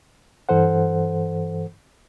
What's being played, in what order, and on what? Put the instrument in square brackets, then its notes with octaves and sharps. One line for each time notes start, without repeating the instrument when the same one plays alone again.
[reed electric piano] G2 E3 A4 C5 F#5